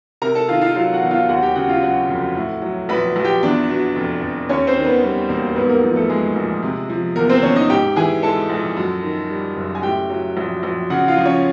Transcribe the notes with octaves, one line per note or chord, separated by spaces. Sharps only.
C3 A#4 A#5
A4 A5
D#3 F4 F5
F4 F5
F#3 F4 F5
F#4 F#5
E2
F4 F5
D#2 F#4 F#5
G4 G5
C#3 F#4 F#5
F4 F5
F#3 F#4 F#5
F1
A2
F#3
A#1 B4 B5
A#1
G4 G5
E2 D4 D5
B2
F1
F1
D#2 C#4 C#5
C4 C5
D#3
B3 B4
G3 B3 B4
E1 A#3 A#4
G#2 B3 B4
A#3 A#4
F3
A3 A4
G#3 G#4
A#1
C3
F3
E2 A#3 A#4
C4 C5
E2 C#4 C#5
D#4 D#5
G#2 G4 G5
E3 G#4 G#5
G#3 A4 A5
A#1
F#2
D#3
G3
F#1
G#5
A2 G4 G5
F#3
A#1
A#1
C#3 F#4 F#5
F4 F5
F3
C#4 C#5